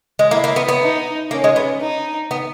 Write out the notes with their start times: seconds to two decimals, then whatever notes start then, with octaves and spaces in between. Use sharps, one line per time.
0.19 G#3
0.31 A#3 E4
0.44 A#3
0.56 B3
0.69 B3
0.82 D#4
1.30 A#3 C#4
1.44 G#3
1.56 B3
1.81 D#4
2.31 B3